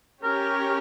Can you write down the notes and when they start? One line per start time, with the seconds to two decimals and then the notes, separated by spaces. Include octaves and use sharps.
0.22 C#4 G4 A#4 C#5